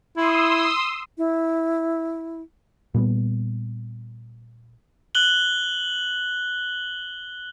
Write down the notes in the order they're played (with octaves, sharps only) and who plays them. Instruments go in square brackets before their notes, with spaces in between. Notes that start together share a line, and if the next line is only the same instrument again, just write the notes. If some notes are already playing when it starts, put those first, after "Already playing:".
[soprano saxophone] E4 [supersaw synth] C6 D#6 E6
[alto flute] E4
[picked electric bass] A#2 G3 G#3 B3
[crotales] F#6 F#7 G7